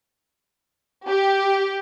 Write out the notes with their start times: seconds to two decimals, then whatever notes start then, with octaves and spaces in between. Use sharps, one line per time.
1.07 G4